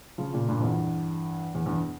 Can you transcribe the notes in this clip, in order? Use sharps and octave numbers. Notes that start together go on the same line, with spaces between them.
C#3 F3
A#2 C#3
G2 A#2
F2
E2 G2
E2
E2 G2